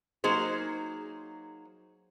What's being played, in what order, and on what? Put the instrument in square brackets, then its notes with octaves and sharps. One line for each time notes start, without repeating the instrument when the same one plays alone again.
[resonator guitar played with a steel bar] F#3 A#3 D#4 G#4 C5